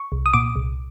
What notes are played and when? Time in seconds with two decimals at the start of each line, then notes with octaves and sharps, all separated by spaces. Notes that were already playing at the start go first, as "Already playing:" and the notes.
Already playing: C#6
0.12 C2
0.26 D#6
0.33 A#2 D6
0.56 C2